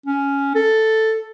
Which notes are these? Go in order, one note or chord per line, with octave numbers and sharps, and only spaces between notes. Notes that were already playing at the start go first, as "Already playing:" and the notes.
C#4
A4